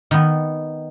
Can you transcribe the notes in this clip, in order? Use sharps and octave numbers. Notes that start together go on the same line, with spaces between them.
D#3 B3